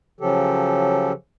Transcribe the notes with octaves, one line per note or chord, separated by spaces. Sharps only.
C#3 F3 F#3 G4 A4